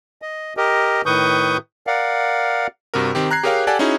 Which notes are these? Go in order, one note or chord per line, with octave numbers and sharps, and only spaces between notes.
D#5
G4 A#4 D#5
A2 D#3 B4 C#6 D#6 G6
A#4 D5 F5 F#5
G2 C3 F#4 A#4
D#3 C4 G4
A#5 F#6 G#6 C7
G4 G#4 A#4 C#5 F5 G5
G4 A4 D5 F#5 G#5 A5
C#4 D#4 E4 F#4 G#4